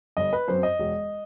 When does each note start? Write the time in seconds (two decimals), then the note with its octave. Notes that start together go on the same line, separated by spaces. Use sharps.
0.17 G1 D#5
0.33 B4
0.48 F#2 F#3 C4 C5
0.63 D#5
0.79 E1